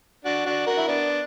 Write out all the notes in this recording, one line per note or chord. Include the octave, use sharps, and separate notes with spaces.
D4 F#4
D4 F#4
F#4 A#4
E4
B3 D4